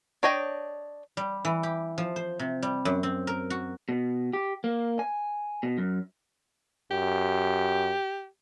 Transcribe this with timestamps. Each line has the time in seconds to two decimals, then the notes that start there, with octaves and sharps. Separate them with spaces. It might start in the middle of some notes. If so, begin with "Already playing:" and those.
0.23 D4 C#5 D#5 G5
1.17 G3
1.45 E3
1.63 G4
1.98 F3
2.16 C5
2.39 C3
2.62 G3
2.85 F#2
3.03 C4
3.27 A#4
3.50 F#4
3.89 B2
4.33 G4
4.64 A#3
4.99 G#5
5.63 B2
5.78 F#2
6.91 F#2 G4